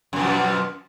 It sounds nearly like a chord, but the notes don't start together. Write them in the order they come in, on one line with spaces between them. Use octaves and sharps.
F#2 B2 F3